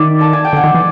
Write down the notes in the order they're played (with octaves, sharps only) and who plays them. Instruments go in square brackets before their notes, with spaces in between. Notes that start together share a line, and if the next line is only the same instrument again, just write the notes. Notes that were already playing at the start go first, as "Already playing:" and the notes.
Already playing: [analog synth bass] D#3 [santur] D5 E5
[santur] A5
G#5
G5
[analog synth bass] D3
[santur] F#5 G#5
[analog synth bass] D#3
E3